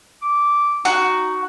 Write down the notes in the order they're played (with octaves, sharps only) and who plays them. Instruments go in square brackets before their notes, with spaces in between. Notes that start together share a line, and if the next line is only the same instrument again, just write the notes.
[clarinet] D6
[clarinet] D#4 [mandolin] F#4